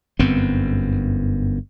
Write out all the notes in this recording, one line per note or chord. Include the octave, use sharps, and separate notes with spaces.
G1 F#2 B3 C4